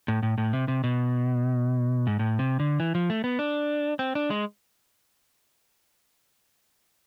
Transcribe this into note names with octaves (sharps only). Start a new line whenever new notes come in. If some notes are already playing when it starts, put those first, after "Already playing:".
A2
A2
A2
C3
C3
B2
G#2
A2
C3
D3
E3
F3
A3
B3
D4
C4
D4
G#3